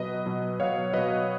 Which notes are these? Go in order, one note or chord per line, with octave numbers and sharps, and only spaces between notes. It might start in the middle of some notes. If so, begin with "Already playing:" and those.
Already playing: B2 F#3 B4 D#5
B2 F#3
B2 F#3 C#5 F5
B2 F#3 B4 D#5